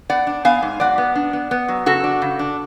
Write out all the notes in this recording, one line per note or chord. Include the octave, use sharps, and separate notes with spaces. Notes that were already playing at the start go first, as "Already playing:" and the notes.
B3 D5 F#5
D4
B3 F5 G#5
G#2
F#3 D5 F#5
B3
D4
B3
B3
F#3
C#3 F#4 A4
D4
C#3
D4